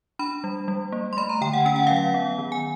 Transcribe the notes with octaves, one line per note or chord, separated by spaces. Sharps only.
D4 B5
G3
G3
A#3
C6
A3 B5
A#5
D3 G5
F#5
C#4 G5
F#5
F#3 F5
F#5
B3
D#3
G#5